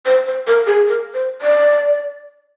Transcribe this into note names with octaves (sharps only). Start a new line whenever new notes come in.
C5
C5
A#4
G#4
A#4
C5
D5